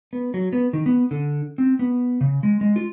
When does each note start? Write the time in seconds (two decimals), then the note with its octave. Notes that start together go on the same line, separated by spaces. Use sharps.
0.13 B3
0.34 F#3
0.53 B3
0.73 D#3
0.86 B3
1.11 D3
1.58 C4
1.79 B3
2.21 C#3
2.43 G#3
2.61 G#3
2.76 F4